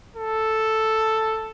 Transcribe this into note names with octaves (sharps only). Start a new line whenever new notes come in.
A4